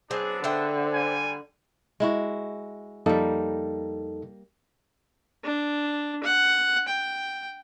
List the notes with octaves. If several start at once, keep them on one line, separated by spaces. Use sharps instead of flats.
F#3 B3 C4 D4 G#4
D3 C5 E5 G5
G3 G#5
G#3 E4 F#4
F2 G3 A#3 D#4 A4
D4
F#5
G5